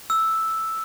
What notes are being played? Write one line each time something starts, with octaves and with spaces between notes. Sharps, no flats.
E6